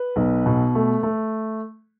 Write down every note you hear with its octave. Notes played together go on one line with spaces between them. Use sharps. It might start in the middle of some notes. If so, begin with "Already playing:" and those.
Already playing: B4
B1
B2
A3
A3